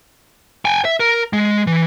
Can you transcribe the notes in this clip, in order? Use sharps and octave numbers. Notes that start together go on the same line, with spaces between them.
G5 G#5
E5
A#4
G#3
E3